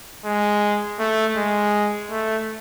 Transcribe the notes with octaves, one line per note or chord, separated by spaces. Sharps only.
G#3
A3
G#3
A3